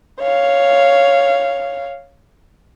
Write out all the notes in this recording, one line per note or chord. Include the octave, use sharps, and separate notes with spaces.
C#5 F5